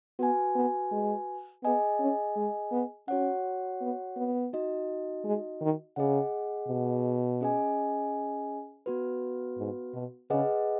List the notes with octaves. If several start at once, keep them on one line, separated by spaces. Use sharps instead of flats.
B3 F#4 B4 G#5
B3
G#3
B3 G#4 D#5 G#5
C#4
G#3
B3
C#4 F#4 C#5 F#5
B3
B3
D#4 F#4 D#5
G#3
D#3
C#3 G#4 D#5 F#5
B2
C#4 G#4 D#5 G#5
B3 F#4 B4
G#2
B2
C#3 G#4 B4 D#5 F#5